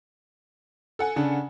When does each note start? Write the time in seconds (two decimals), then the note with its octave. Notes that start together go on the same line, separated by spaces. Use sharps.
0.99 A4 F#5 G#5
1.16 C#3 D4